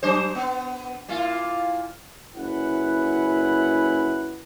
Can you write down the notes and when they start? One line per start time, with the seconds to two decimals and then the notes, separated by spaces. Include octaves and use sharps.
0.03 F#3 D4 C5
0.35 B3
1.08 A#2 E4 F4
2.35 F#1 C#4 E4 B4 F#5